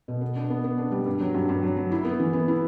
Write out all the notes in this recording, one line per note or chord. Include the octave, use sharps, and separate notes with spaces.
B2
B3
D4
B3
B3
D4
G3
G2
F#3
G2
G2
F#3
F#3
E4
B3
E3
B3
E4